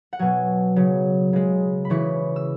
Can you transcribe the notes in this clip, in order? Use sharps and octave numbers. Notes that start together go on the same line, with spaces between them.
F#5
B2 F#3 G#5
C#3 F#3
C#3 G#3
B5
C#3 E3 G#3 C#6
E6